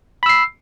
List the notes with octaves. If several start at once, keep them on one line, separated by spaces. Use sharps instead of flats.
B5 E6 C7